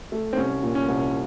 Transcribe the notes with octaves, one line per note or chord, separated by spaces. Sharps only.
A3
C4
C2 C#4
A#2
C#4
C2